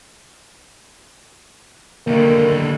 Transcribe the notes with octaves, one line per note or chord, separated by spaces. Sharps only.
D#2 D3 A#3